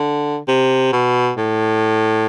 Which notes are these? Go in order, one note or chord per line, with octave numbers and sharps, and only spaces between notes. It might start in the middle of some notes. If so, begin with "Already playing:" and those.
Already playing: D3
C3
B2
A2